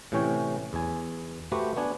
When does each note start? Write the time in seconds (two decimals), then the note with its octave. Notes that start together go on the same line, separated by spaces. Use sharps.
0.12 A2 C3 E3 C#4 C#5 G5
0.73 E2 G#5
1.52 A3 F#4 G4 B4 C5 F#5
1.77 B3 D4 G#5